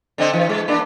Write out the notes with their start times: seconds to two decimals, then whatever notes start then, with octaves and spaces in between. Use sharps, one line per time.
0.18 D3 C4 D#5
0.33 E3
0.49 G#3
0.68 A#3 D4